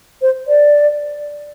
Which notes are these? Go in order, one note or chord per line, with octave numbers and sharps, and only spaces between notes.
C5
D5